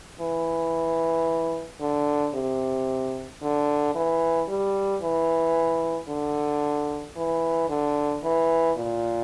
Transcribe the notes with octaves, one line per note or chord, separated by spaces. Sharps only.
E3
D3
C3
D3
E3
G3
E3
D3
E3
D3
E3
A#2